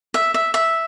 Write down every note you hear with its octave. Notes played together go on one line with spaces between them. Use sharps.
E5
E5
E5